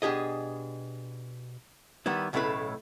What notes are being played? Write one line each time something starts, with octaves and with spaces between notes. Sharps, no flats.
B2 D4 G4 G#4 D#5
D#3 G3 B3 E4
B1 A2 C#3 A3 E4 B4